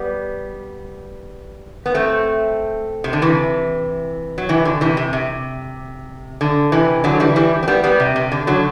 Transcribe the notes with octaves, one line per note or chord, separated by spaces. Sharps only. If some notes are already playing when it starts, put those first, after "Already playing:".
Already playing: G3 B3
B3
A3 C4
C3
D3
C3 E3
F#3
C3 E3
D3
C3 E3
C3
C3
D3
C3 E3
D3 F#3
E3 G3
E3 G3
C4
G3 B3
G3 B3
C3
C3
D3
D3 F#3